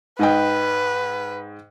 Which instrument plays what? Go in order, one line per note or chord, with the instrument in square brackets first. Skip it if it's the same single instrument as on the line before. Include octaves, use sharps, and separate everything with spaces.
[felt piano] G#2 D#5 G5 [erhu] B4